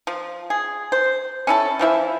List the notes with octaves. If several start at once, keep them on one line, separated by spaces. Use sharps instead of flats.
F3
G#4
C5
C#4 E4 A4
E3 F3 E4 E5